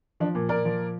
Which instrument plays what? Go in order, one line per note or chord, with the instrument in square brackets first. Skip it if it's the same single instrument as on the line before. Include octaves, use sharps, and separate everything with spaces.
[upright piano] F3 D4
A#2
A#2 A#4 D5
F3